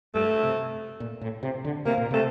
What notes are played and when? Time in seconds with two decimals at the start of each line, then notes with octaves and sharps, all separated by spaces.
0.14 G2 A3
0.43 C3
1.00 A#2
1.21 A2
1.43 C3
1.65 D3
1.85 C3 A#3
1.98 A#2
2.11 C3 A3